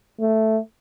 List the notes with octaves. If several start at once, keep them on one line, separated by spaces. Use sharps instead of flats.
A3